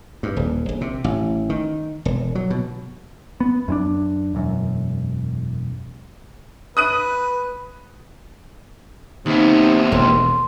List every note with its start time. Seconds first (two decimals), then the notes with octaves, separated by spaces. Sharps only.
0.23 G2
0.37 D#1
0.69 A#1
0.81 C3
1.04 A1
1.50 D#3
2.05 E1
2.35 F#3
2.50 B2
3.40 B3
3.68 F#2 C#4 D4
4.35 E1 F#2
6.77 B4 D#6 F#6 D#7
9.26 D#2 C3 B3 D#4
9.92 E1 C6